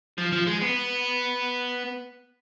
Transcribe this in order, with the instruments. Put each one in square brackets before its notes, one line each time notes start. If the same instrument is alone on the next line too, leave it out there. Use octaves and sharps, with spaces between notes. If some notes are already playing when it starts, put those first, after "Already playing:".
[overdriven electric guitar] F3
F3
G#3
B3